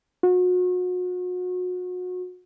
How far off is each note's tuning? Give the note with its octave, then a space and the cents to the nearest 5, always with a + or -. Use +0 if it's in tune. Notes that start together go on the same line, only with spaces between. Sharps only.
F#4 -35